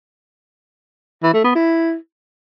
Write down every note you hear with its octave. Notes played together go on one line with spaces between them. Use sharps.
E3
A3
B3
E4